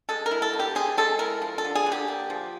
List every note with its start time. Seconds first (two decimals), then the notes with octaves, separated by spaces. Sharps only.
0.09 G#3 A4
0.26 A#4
0.31 E4
0.42 A4
0.53 B2
0.60 G4
0.75 C4 G#4
0.97 G#3 A4
1.19 E4 A#4
1.42 F3
1.58 A4
1.64 D3
1.76 G#4
1.86 D3
1.92 G4
2.08 A#3
2.30 F3